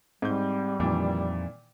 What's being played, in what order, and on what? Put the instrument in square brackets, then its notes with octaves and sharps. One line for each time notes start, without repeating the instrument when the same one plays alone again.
[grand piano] G#2 G6 [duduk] G3 [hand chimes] C4
[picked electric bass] F2 [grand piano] A#2 D#3 E3 [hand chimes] D5